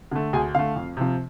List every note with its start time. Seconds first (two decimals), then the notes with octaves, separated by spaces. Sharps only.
0.12 D3 A3
0.33 D2 G#4 G#5
0.55 D3 A3 F5
0.76 F2
0.97 C3 F3